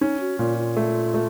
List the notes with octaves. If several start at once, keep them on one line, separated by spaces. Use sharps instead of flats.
C#4 D#4
F#4
A#2 F4
F4
A3
A3